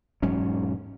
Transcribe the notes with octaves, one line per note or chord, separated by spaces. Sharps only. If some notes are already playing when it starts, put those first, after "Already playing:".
E1 G#2 F#3 C#4